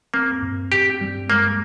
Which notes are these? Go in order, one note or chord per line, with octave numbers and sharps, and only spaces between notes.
A#3 C4
G2
G2 G4
G3
G#3 A#3